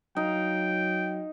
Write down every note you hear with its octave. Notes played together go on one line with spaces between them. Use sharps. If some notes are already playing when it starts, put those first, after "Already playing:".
F#3 D#4 F5 G5